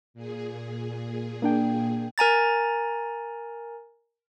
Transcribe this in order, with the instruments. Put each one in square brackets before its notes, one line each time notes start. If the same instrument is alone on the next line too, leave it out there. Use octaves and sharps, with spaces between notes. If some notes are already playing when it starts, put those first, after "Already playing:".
[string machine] A#2 G#4
[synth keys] A#3 D4 G5
[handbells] A#4 G#5 A#5 A6